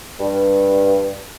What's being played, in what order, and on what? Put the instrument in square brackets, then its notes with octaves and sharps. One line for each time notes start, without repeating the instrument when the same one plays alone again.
[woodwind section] G2